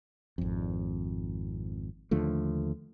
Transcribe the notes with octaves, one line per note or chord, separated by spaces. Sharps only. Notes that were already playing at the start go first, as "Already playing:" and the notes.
G#1 F2
D#2 D3 F3 A3